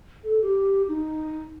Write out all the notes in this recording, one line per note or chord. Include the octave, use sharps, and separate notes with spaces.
A4
G4
D#4